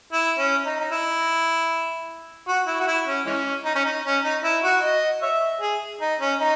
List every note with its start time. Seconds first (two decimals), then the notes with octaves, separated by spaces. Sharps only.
0.13 E4
0.38 C#4
0.66 D#4
0.80 D#4
0.91 E4
2.48 F#4
2.67 E4
2.80 F#4
2.87 E4
3.07 C#4
3.26 E3 G#3 C#4
3.65 D#4
3.75 C#4
3.85 D#4
4.05 C#4
4.24 D#4
4.44 E4
4.63 F#4
4.82 D#5
5.22 C#5 E5
5.61 G#4
6.01 D#4
6.20 C#4
6.39 D#4